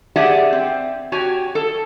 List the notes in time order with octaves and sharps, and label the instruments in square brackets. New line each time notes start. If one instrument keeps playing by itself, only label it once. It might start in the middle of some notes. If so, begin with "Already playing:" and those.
[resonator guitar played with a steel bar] G4 G#4 D5 E5 F#5
C4
F#4 G4 C#5 G#5
A4